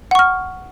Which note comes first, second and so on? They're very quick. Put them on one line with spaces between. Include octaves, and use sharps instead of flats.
F#5 C#6 F6